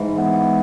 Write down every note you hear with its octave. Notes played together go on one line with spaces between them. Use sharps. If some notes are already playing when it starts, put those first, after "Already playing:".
Already playing: G#2 E3
B3